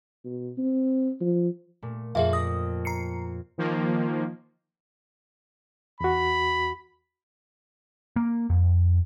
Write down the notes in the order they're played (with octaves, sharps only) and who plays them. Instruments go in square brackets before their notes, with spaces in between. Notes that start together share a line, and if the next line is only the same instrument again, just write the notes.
[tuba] B2
C4
F3
[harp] A#2 A3
[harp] F2 A#2 [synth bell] G#4 E5 F5
[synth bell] D#6 [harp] A#6
[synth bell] A#5 C7 C#7
[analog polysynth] D#3 F3 A#3
[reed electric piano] E2 F#4 [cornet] B5
[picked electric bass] A#3
F2